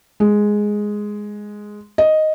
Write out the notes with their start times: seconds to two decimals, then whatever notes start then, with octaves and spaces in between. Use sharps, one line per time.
0.20 G#3
1.98 D#5